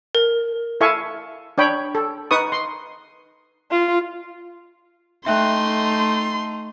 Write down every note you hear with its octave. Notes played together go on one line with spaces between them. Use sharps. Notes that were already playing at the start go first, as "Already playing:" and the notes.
A#4
E4 A4 E5 F5 G#5 C#6
D4 C#5 G5 B5
A4
D#4 B4 C#6 D#6
C6
F4
A3 D#4 E5 G5 C6 F#6